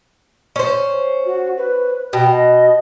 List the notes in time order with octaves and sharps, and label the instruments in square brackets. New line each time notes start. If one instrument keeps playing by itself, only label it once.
[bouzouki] C#4 C5
[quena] F#4
B4
[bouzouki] B2 [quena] G5
[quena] D#5